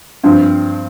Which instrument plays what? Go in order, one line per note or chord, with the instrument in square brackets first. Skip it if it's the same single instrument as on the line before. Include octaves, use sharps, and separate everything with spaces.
[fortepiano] G2 F3 C4